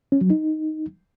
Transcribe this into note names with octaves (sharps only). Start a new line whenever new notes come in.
C#4
F#3
D#4